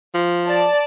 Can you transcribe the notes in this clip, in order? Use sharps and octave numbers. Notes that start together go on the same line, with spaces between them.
F3
D5 A5